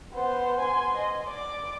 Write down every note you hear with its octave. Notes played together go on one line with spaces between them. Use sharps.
B3 C5
G#5 C6
D#5
D5 D6